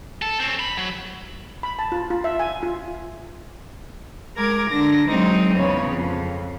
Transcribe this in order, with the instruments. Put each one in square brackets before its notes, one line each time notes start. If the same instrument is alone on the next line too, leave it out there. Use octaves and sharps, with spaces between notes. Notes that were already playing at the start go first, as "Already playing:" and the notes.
[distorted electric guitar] A4
C4 C#4
B5
F#3
[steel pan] B5
A5
F4
F4
E5
G#5
F4
[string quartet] G#3 A#4 A#5 D6 G#6
D3 D4 A#6
F#3 G#3 C4 D#4
E2 C#3 B3 C#5
F2